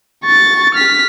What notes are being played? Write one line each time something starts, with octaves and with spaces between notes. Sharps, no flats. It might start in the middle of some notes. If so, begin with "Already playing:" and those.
C#6 A6
F6 B6